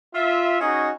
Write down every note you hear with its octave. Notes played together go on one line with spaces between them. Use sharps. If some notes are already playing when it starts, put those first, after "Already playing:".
F4 E5
C#4 D#4 F#4 G#4 D#5